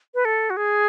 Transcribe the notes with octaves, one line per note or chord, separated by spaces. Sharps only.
B4
A4
F#4
G#4